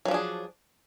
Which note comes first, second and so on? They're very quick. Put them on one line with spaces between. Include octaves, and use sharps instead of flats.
F#3 F3 D4 G#4